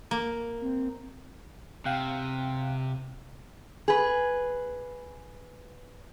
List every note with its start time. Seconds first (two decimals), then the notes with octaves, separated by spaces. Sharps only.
0.11 A#3
0.61 C4
1.85 C3 F5 G5 F#6
3.88 G#4 B4